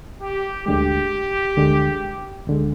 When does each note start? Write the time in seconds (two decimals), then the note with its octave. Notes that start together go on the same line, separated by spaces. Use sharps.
0.21 G4
0.66 D2 D3 G#3 G4
1.57 D2 D3 G#3
2.47 D2 D3 G#3